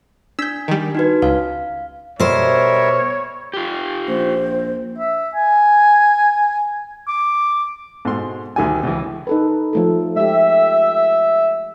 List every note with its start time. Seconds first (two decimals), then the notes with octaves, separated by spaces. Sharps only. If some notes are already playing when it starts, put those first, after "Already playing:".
0.39 D4 E6 G6 B6
0.68 D#3 G3
0.95 D#4 F#4 B4
1.22 C#2 F5
2.20 B2 G3 A#4 C5 C#5 E5
3.53 F4 G4
4.08 A#1 C5
4.98 E5
5.35 G#5
7.08 D6
8.05 G#2 B2 A3 C6
8.56 D2 D#3 G3 G#5
8.83 C#2 C#3 E3
9.27 D#4 A4 B4
9.73 F3 A3 A4
10.16 G#3 G4 E5